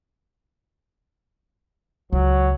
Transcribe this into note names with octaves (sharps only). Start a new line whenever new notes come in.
C#2 F#3